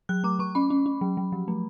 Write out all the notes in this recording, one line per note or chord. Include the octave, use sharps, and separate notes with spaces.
F#3 F#6
A3 D6
A3 C#6
C#4 B5
C#4
C#4
F#3
F#3
F3
A3